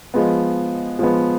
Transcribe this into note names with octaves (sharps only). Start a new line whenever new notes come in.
F3 G#3 B3
F3 G#3 B3